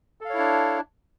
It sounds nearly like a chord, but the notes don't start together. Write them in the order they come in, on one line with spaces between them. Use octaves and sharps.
A4 F5 C#5 E4 D4